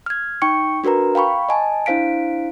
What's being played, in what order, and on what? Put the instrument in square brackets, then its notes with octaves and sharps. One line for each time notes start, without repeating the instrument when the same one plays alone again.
[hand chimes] F6 G#6
D#4 G5 C#6 C#7
D4 F#4 A#4 B4 A#5
F5 G5 B5 C#6
D#5 G#5 A5
D4 E4 C5 F5 B6 D7